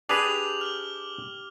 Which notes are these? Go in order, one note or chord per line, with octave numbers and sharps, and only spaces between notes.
D4 G4 G#4 B4 D6 F7 F#7
F6 F7 G7